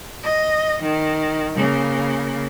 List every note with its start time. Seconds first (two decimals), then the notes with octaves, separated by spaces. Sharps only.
0.23 D#5
0.83 D#3
1.56 C#3 A#3